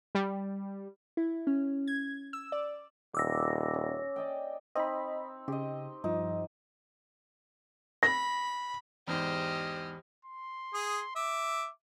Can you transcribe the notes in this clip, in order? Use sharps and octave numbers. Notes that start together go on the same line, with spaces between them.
G3
E4
C#4
G#6
E6
D5
D#1 D6 E6 A#6
C#4
D5 D#5 G5
C4 D#4 D#5 B5
C#3 G4 D#5
G2 F3 D#4
B5 A#6
E2 G#2 E3 G4 C5 D#5 F6
C6
G#4 D#6
E5 D6